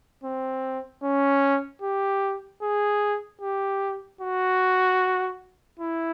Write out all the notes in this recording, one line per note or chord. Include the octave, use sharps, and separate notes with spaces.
C4
C#4
G4
G#4
G4
F#4
E4